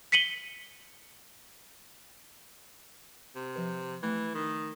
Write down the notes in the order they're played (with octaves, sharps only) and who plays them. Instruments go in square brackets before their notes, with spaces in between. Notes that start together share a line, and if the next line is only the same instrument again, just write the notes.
[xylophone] B6 C#7 D#7 F#7 G7
[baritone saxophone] C3
[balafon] F3 B4
[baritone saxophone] E3 [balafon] A3
[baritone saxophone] D#3